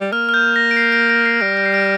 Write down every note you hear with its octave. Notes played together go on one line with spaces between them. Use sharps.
G3
A#3 F6
F6
G6
A#6
D7
C7
A#6 D7
A#6 D7
C7
G3 A#6 D7
A#6 D7
C7
A#6 D7